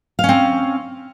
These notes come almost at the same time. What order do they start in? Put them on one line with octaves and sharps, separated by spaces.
F5 C#4 C4